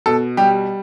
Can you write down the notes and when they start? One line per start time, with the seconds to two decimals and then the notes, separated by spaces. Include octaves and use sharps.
0.06 B2 A4
0.37 G3 G4